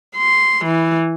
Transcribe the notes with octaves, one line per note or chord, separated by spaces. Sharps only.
C6
E3